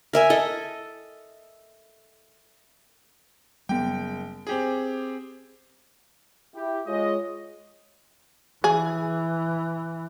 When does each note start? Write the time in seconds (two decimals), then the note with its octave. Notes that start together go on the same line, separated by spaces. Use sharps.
0.13 A#4 E5 G#5
0.30 A4 D#5
3.69 F#1 G3 B3 G5
4.47 C4 G4 G#4
6.55 E4 G4
6.86 G#3 F4 C#5 D#5
8.64 E3 G#4